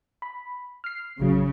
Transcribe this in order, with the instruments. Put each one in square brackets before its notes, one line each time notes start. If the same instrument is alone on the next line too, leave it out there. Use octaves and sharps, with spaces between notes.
[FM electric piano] B5
F6 C7
[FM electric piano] A1 F#3 [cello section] C#3